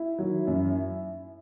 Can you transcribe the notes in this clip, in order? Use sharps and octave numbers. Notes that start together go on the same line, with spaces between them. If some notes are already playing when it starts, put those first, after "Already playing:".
Already playing: E4
D#3 F#3
F#2